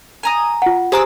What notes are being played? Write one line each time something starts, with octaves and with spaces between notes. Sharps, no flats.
G#5 A#5 D#6
F4 F#5
G4 G#4 C5 A#5 D6 E6